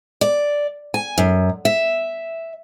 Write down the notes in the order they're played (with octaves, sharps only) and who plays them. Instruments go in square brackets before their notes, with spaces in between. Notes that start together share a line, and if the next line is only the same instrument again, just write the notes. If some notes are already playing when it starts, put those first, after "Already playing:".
[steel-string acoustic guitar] D5
G#5
F#2
E5